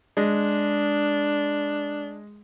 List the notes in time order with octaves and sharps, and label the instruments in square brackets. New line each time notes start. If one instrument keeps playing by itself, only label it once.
[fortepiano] G#3 [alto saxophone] D4